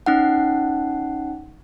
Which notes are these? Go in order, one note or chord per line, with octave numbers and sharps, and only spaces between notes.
C#4 D#4 F#5